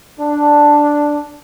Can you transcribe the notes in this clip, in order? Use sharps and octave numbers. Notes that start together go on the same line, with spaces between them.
D4